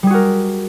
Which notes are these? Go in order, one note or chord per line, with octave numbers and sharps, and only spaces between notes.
G3 F#4 G#4 A#4